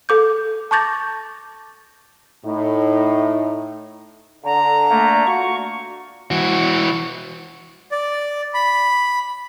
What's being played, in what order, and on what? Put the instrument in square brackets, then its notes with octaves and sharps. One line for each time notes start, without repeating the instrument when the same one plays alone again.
[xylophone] A4 D6 G6
A5 C#6 D6 G6 A6 A#6
[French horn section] A2 D#4
[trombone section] D3 [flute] A#5
[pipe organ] A3 A#3
[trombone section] F4 F#4 [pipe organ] C#6
[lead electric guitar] E3 F#4
[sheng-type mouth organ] D5
B5